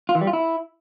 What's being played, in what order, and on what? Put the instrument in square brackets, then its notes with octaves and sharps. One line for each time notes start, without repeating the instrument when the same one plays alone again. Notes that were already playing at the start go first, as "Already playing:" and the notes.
[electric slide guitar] F4
E3
G3
F4
E4